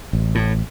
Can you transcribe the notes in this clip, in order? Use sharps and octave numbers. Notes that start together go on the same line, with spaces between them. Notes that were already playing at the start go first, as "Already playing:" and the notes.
A1
A2